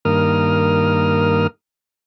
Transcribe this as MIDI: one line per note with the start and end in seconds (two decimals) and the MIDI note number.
0.05 1.47 43
0.05 1.47 51
0.05 1.47 58
0.05 1.47 70
0.05 1.47 87
0.05 1.47 89